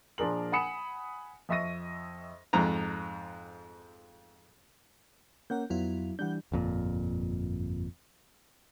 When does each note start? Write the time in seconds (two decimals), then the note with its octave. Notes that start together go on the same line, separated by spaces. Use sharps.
0.18 A#2 F3 D4 G#4 A#4 F#7
0.52 F#5 G#5 B5 D#6 C#7 E7
1.49 F2 D#5 E5 C#6 A#6 D#7
2.53 F2 G#2 A#5
5.50 A#3 C#4 A#4 F#5 G6
5.70 F2 F#3 B3 E4 F4
6.19 E3 G3 D4 F#5 G6
6.52 G1 F2 A#2